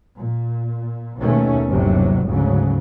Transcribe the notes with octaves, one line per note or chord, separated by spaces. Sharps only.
A#2
D#2 B2 D#3 A3 C#4
G1 D#2 C3 F#3 G3
D2 G#2 C#3 F#3